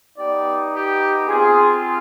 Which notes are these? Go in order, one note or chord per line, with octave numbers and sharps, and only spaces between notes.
B3 D#4 G4 D5
G4
C4 F4 G#4